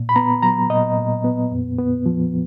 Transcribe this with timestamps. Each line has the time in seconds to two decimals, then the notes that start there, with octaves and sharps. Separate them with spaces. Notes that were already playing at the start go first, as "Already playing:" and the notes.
Already playing: A#2
0.09 B5
0.16 B3 A#5
0.43 F#3 A#5
0.70 A#2 D#5
0.97 A#2
1.24 B3
1.51 F2
1.78 B3
2.06 F3